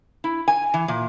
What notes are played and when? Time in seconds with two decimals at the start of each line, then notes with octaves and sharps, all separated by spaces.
0.24 E4
0.48 G#5
0.74 E3
0.88 A#2